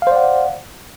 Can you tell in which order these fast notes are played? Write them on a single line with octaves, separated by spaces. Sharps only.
F5 C5 D5 F#5